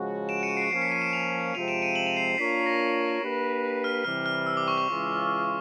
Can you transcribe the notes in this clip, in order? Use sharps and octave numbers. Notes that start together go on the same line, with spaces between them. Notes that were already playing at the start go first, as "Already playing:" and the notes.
Already playing: C#3 F3 G#3 C#4 F#4
D7 E7
C#7 D#7
C7 D7
F3 A#3 C#4 C7
B6 C#7
C#7 D#7
D7 E7
D#7 F7
C3 F3 G#3 C4 F4 D#7 F7
D7 E7
C#7 D#7
E7 F#7
D#7 F7
C7
C7
A#3 D4 F4 A#4 C#5 B6
C7
A#6
A#3 D4 G4 B4
F6
C3 E3 G3 F6
F6
E6
D6
C#6
C#6
C#3 E3 G#3 C#4 F4